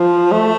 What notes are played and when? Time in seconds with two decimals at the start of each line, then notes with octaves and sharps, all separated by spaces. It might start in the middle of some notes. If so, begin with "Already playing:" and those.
Already playing: F3
0.32 A3